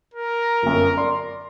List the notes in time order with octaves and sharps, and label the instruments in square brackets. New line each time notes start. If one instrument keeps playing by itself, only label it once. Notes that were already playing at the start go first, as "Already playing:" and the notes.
[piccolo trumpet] A#4
[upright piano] G1 F#2
D5 C6